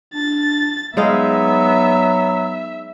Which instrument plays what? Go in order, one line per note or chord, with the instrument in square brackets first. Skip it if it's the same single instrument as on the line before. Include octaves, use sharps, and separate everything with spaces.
[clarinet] D4 [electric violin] A6
[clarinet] F#3 [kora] G#3 D#4 F5 [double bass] B3 [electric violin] E5